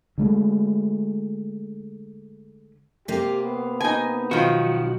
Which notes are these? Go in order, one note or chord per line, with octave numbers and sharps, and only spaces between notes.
D3 G#3 A3
C3 A#3 G4
B3
D#4 G#5
B1 D#3 F3 F#4